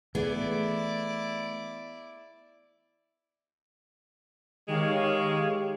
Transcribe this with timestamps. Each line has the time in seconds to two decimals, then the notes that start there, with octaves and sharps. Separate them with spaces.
0.15 E3 A3 B3 E4 G#4 D5
4.68 D#3 G#3 G4 C#5 F5